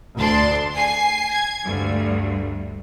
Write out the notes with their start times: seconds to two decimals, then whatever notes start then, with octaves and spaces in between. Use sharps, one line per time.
0.16 D2 D4 C6
0.74 G#5 C7
1.32 G#6
1.63 D2 G2